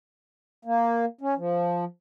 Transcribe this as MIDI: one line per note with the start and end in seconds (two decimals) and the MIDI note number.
0.65 1.05 58
1.21 1.34 61
1.37 1.85 53